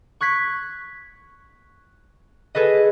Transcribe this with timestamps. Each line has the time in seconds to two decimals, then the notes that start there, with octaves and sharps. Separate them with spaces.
0.21 C#6 F#6 G#6 B6
2.55 G#4 A4 B4 D#5